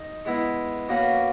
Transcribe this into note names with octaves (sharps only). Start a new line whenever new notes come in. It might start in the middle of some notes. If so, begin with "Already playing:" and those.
Already playing: D#4
G#3 B3 E4 B4
B2 A#3 C#4 F#4 B4